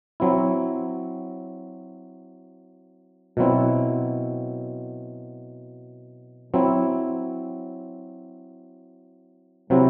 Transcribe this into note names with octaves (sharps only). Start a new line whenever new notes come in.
F#3 C4 E4
B2 F#3 C4 E4
F#3 C4 E4
C3 F#3 C4 E4